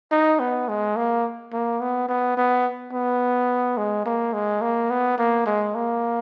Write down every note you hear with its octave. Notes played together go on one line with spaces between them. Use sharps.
D#4
B3
G#3
A#3
A#3
B3
B3
B3
B3
G#3
A#3
G#3
A#3
B3
A#3
G#3
A#3